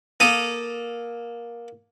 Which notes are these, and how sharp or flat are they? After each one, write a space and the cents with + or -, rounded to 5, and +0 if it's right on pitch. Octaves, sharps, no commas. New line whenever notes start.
A#3 +15 A4 +0 D#6 +0